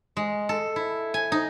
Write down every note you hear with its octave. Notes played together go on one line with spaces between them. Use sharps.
G#3
A4
E4
G#5
D#4